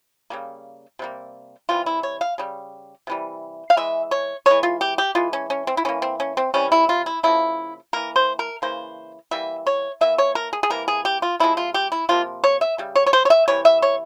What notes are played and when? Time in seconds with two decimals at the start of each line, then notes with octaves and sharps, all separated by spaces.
0.30 C#3 G3 A#3
0.99 C3 G3 A#3
1.69 C3 E3 G3 F4
1.86 E4
2.03 C#5
2.21 F5
2.38 C#3 G3
3.07 C3 E3 G3
3.70 F5
3.77 E3 G#3 E5
4.11 C#5
4.46 E3 G#3 C#5
4.63 F4
4.81 G4
4.98 G4
5.15 E3 G#3 F4
5.33 C#4
5.50 C#4
5.67 C4
5.77 E4
5.85 E3 A#3 C#4
6.02 C4
6.20 C#4
6.37 C4
6.54 C3 E3 G3 C#4
6.72 E4
6.89 F4
7.06 E4
7.23 C#3 F3 A#3 E4
7.93 E3 A#3 A#4
8.16 C5
8.39 A#4
8.62 C#3 E3 A#3 C5
9.31 E3 G3 A#3 E5
9.67 C#5
10.01 E3 A#3 E5
10.18 C#5
10.35 A#4
10.53 G#4
10.63 G#4
10.70 C3 E3 A#3 A#4
10.88 G#4
11.05 G4
11.22 F4
11.40 C3 F3 G#3 E4
11.57 F4
11.74 G4
11.92 E4
12.09 C3 F3 A#3 F4
12.44 C#5
12.61 E5
12.78 C#3 G3
12.96 C#5
13.06 C#5
13.13 C5
13.25 C#5
13.30 E5
13.48 C3 E3 G3 C#5
13.65 E5
13.82 C#5